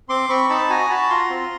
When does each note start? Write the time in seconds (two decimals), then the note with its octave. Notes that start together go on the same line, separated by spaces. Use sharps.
0.09 C4 C6 D6
0.29 C4 B5 C#6
0.50 D#4 A5 B5
0.70 F#4 G#5 A#5
0.90 F#4 A5 B5
1.10 F4 A#5 C6
1.30 C4